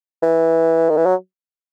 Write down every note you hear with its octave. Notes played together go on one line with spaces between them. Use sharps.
E3
D#3
E3
F#3